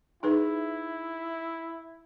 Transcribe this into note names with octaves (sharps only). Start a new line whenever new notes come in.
D#4 E4 G#4 B4